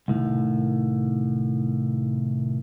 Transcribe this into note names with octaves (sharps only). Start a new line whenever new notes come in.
C2 A2 D#3